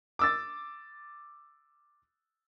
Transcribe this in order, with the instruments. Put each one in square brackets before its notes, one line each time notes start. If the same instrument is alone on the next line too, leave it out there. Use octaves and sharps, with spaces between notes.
[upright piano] D6 E6 A6